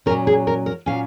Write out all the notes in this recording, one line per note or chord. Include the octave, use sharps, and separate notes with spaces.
A#2 F#3 C#4 A#4
G#4
A#4
A#4
A#2 F#3 C#4 F5